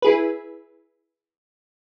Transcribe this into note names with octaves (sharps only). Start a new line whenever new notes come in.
E4 G#4 B4